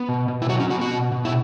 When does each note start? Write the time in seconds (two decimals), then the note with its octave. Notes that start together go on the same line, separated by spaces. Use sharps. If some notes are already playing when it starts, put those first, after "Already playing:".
Already playing: B3
0.09 B2
0.28 B2
0.42 E4
0.49 F#3 F#4
0.60 C#4
0.70 B3 F#4
0.81 F#4
0.91 B2
1.12 B2
1.25 E4